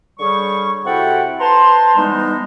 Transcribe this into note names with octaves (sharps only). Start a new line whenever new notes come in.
D3 G3 G#4 C#5 C#6
C3 E4 F#4 A4 F#5 G5
B4 C5 A5 A#5 C6
E3 G3 G#3 B3 D#4